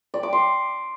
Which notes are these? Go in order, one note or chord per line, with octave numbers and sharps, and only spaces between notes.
D5
D6
C6